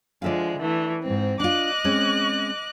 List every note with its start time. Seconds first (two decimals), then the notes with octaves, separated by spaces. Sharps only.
0.22 D3 F3 G#3 D5 E5 F5
0.60 E3 A3
1.02 G#2 C4
1.40 D4 F4 D#5 D6 F#6
1.84 G#3 C4 C#4